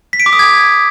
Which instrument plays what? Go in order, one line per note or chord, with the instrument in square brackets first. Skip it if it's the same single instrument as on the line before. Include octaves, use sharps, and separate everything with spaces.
[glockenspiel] B6
D7
D6
D#6
G#6